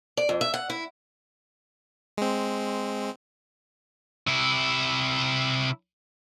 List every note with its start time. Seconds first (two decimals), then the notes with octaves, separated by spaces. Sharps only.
0.17 D5
0.29 F2
0.41 E5
0.54 F#5
0.70 E4
2.18 G#3 C4
4.27 C3 E4